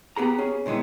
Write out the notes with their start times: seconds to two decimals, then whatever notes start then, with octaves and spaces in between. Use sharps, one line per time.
0.16 B3 G4 G#4 A#5
0.38 C#4 G#4
0.66 A#2 D#3 G#3 B3 E4